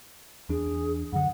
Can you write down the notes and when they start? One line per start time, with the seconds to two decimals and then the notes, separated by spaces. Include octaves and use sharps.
0.49 E2 D4 G#4
1.12 F#2 D3 F#5